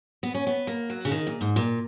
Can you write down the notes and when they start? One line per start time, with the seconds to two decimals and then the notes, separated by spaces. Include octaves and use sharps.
0.23 B3
0.34 C#4
0.47 B3
0.67 A#3
0.90 F#3
1.05 C#3
1.11 D#3
1.27 A#2
1.41 G#2
1.56 A#2